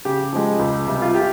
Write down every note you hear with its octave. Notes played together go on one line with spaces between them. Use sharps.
C#3 G4
F3 G#3
C#2
C3 G3
F4
G4